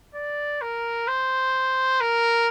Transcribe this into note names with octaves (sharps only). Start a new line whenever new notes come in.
D5
A#4
C5
A#4